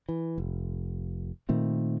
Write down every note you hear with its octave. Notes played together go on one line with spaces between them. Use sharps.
E3
F1
A#2 D#3 A3 C4